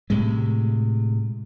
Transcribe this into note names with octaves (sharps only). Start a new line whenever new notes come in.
A2 C3 G#3